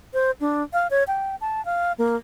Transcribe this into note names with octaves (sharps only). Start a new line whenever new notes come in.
C5
D4
F5
C#5
G5
A5
F5
A#3